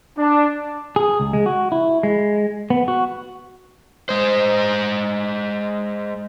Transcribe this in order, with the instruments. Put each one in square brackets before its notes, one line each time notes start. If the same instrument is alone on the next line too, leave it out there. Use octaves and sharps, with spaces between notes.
[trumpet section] D4
[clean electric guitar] G#4
C#2
G#3
F#4
E4
G#3
B3
F#4
[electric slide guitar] G#3 C5